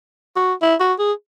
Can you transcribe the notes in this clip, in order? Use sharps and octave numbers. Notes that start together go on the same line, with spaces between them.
F#4
E4
F#4
G#4